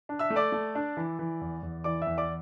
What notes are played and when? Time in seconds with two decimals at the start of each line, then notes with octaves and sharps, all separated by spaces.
0.09 D4
0.19 E5 E6
0.30 A3
0.36 D5 D6
0.52 A3
0.75 D4
0.97 E3
1.19 E3
1.41 E2
1.63 E2
1.84 E3 D5 D6
2.02 E5 E6
2.07 E2
2.18 D5 D6